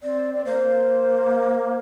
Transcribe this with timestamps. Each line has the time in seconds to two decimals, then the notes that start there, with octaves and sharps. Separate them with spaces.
0.03 C4 D5
0.34 D5
0.45 A#3 C5